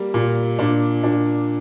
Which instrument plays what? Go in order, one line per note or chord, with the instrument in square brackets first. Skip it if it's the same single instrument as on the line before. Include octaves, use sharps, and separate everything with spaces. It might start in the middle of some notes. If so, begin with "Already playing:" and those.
Already playing: [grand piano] G3 A#3
A#2
A#2 D4
A#2 D4